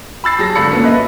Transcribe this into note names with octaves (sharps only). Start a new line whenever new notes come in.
B5 E6 A6 C7
F#3 G#4 A5 A#6
G#1 D3 A4 B5 C#7
A#2 A#3 B3 C#4
B4 D#5 E5